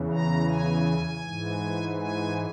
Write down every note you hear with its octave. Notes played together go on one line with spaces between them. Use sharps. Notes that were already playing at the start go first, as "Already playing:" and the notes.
Already playing: E2 C#3 E3
A#5
G#5
G#2 E3
G#5